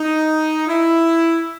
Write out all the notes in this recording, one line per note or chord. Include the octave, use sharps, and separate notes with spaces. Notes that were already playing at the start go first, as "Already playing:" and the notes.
Already playing: D#4
E4